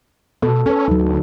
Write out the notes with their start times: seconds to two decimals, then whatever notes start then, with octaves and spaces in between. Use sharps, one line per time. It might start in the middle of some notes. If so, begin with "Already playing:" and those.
0.42 B2 A4
0.66 C#4 A4 B4
0.88 D2 F#3 D#4